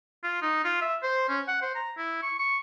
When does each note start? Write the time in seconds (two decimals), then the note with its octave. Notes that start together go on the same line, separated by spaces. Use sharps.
0.23 F4
0.42 D#4
0.64 F4
0.82 E5
1.03 C5
1.29 C#4
1.48 F#5
1.62 C5
1.75 A#5
1.98 E4
2.23 C#6
2.39 C#6